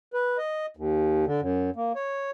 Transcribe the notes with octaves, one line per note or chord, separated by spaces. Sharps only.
B4
D#5
D#2
D3
F#2
A#3
C#5